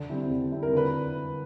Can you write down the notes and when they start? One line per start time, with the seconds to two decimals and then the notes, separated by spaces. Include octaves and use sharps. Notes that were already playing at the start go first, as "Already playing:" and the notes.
Already playing: D3
0.10 G3 C4 E4
0.30 D3
0.52 G3 C4 E4
0.63 A#4
0.73 D3 B4